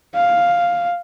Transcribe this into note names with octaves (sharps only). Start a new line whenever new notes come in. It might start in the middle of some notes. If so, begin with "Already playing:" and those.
F5